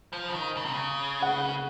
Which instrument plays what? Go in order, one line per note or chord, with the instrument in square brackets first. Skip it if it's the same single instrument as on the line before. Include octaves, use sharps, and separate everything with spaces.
[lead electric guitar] F3
C#3
D#3
C#3
C3
C#3
[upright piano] F#5